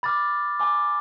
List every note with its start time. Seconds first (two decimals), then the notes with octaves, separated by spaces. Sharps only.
0.03 B5 D6 F6 A6
0.59 G#5 B5 D6